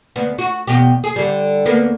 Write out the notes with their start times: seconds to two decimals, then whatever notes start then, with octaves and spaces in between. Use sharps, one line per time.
0.16 D2 B3
0.38 F#4
0.67 E2 B2 G4
1.04 G#4
1.16 D3 G3
1.66 D2 A#3 B3